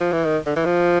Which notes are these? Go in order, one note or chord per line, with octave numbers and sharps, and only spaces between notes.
F3
E3
D#3
D3
E3
F3